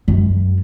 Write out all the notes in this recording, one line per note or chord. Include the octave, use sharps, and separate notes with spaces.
F#2